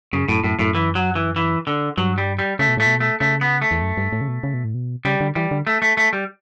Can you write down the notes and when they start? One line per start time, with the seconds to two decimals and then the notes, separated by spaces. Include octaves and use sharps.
0.13 F#2 C#3
0.28 F#2 A2
0.44 F#2 A2
0.59 F#2 A2
0.75 E3
0.95 F#3
1.15 E3
1.36 E3
1.67 D3
1.98 G2 F#3
2.18 G3
2.39 G3
2.59 C#3 A3
2.68 B2
2.77 A2 A3
2.86 B2
3.00 A3
3.20 C#3 A3
3.41 B3
3.62 A3
3.71 E2
3.82 F#2
3.97 G2
4.12 A2
4.21 C#3
4.28 B2
4.43 C#3
4.54 B2
4.64 A2
4.75 B2
5.05 C#3 G3
5.21 D3
5.35 E3 G3
5.51 D3
5.67 A3
5.82 A3
5.97 A3
6.13 G3